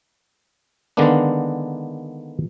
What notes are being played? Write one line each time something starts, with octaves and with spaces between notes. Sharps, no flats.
D3 D#3 G#3 A#3 B3 D4